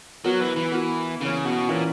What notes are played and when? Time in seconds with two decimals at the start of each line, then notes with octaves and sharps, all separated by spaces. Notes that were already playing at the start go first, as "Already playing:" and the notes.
0.24 F#3 B3 F#4 A#4
0.40 E3
0.56 E3
0.72 B3 F#4 A#4
1.21 C#3 E3 A#3 C#4
1.45 B2
1.69 A#2 E3 A#3 C#4